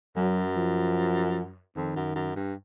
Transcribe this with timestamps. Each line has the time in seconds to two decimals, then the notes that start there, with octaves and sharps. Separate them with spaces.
0.16 F#2 F#3
0.57 F3
1.76 F2 D#3
1.96 F#2
2.16 F#2
2.36 G2